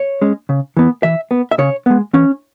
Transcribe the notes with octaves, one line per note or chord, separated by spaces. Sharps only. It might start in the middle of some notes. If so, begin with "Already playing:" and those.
Already playing: C#5
G#3 C#4
C#3
E3 B3
E3 E5
B3
E5
C#3 C#5
G#3 B3
E3 C#4